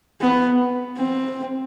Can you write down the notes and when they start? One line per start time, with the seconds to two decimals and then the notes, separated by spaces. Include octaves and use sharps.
0.21 B3
0.97 C4